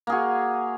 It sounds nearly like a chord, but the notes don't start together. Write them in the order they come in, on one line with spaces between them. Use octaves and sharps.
A#3 G#4 F#4